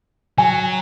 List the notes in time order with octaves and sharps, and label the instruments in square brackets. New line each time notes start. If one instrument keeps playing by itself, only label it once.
[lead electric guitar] F#3 [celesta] G#5